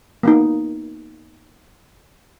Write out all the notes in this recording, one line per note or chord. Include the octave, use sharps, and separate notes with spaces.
A#3 B3 D#4